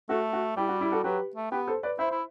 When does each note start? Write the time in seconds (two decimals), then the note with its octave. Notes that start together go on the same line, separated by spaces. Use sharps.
0.09 A3 F#4 A4
0.33 F#4
0.57 G3 E4 G4
0.69 F#4
0.80 E4 G4
0.92 F#4 A4
1.04 F#3 G4 B4
1.36 A3
1.52 B3 G4 B4
1.67 A4 C5
1.83 B4 D5
1.99 E4 C5 E5
2.12 E4